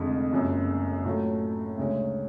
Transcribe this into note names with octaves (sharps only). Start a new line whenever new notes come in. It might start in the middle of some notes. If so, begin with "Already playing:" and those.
Already playing: F1 F2 D3 G#3
F#1 F#2 F3 G#3
A2 F#3 A3 F4
D2 C#3 G#3 C#4